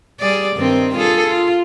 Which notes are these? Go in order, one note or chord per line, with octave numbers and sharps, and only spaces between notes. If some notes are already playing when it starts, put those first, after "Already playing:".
G3 G#4 D5
G2 D#3 C4
F4 G#4 A4
F4